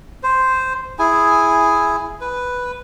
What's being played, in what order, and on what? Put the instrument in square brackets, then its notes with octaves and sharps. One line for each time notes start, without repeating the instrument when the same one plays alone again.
[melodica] C5
E4 G#4 G#5
B4